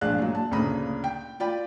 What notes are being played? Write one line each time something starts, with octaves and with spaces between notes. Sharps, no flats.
A#1 G#3 D4 F5 F#6
A#2 F#3
A5
D2 A#2 C#3 A#5 B5 D#6
G5
F4 D5 G5 B5